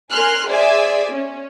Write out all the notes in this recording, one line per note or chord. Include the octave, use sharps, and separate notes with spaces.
A#4 G#5 C6 F6 F#6
G#4 C5 D5 E5 G#5
C#4